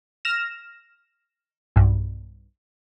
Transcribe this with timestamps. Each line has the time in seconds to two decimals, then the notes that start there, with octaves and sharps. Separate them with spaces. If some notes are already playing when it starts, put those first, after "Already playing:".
0.25 F6 A#6 E7
1.76 B1 G2